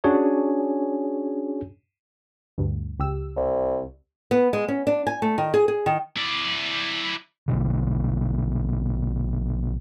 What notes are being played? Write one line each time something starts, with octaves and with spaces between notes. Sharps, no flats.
C#4 D4 F#4 G#4 C#5 G#5
D2 G2
C#2 G4 E6
C2
B3
G#3
C#4
D4
G#5
A3
D#3
G#4
G#4
D#3
E4 D5
A#1 B2 D3